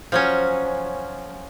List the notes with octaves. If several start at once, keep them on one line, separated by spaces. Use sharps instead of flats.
F3 F#3 C#4